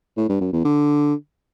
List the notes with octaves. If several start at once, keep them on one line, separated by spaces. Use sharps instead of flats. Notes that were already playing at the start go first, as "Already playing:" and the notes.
A2
G2
F#2
E2
D3